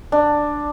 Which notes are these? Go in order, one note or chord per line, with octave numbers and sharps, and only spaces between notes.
D4